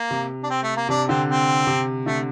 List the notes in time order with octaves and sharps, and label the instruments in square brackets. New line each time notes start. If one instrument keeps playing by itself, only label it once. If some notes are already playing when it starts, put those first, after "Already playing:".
Already playing: [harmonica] A#3
[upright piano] C3
[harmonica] D4
C4
A3
A#3
[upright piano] C3 [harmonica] D4
[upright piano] D3 [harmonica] C4
[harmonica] C4
[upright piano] C3
[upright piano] D3 [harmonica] A3